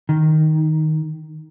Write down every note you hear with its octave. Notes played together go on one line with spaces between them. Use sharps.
D#3